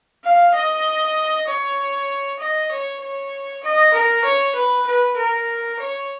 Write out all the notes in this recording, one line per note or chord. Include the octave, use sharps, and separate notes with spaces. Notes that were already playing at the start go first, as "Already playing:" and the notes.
F5
D#5
C#5
D#5
C#5
C#5
D#5
A#4
C#5
B4
B4
A#4
C#5